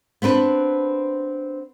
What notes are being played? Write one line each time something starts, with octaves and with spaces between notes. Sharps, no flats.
B3 C4 D4 B4